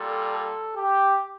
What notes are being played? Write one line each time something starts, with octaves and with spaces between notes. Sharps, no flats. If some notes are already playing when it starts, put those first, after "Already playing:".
Already playing: A#2 G3 A4
A4
G4